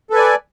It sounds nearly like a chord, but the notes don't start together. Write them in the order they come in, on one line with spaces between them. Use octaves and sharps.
A4 B4 G#5 D5